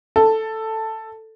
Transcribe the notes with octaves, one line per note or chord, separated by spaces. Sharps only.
A4